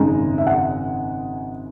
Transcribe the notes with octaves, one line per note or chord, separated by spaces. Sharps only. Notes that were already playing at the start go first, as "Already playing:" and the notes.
Already playing: G#1 F#2 C#3 G#3 D#4 A#5
E5
F#5